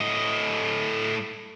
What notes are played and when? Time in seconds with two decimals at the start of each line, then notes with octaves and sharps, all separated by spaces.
0.01 A2 D#5